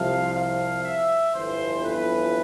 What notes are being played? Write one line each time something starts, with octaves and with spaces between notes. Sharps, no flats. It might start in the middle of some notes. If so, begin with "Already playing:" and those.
Already playing: C2 C3 F3 F5
F5
E5
G1 F2 E3 C5
B4